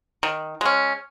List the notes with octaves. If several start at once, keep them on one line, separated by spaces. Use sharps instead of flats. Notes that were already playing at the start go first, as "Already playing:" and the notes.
D#3
G#3 C#4